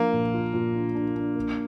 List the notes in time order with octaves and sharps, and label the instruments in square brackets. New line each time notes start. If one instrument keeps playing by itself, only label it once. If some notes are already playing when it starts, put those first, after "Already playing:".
Already playing: [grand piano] F3 D4 [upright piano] A#3
[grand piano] A#2
F4
A#2
D4
D4
D4
A#3